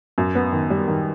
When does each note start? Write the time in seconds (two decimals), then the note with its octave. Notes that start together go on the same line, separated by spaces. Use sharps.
0.18 F#2
0.35 B3
0.53 D#3
0.70 G3
0.88 D#3